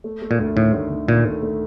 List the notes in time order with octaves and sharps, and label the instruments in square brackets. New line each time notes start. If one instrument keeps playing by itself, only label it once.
[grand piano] A3
A3
[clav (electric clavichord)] A#2
[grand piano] D2
[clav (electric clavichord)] A2 [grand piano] D#3
[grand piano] D2
D#3
[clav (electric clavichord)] A#2 [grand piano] D#3
[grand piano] A3
A3